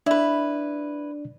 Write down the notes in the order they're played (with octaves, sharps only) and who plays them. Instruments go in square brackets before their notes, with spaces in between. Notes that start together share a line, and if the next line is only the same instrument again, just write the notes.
[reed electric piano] D4 D5 [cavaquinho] E4 B4